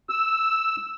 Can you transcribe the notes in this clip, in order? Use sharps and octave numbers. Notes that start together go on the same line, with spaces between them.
E6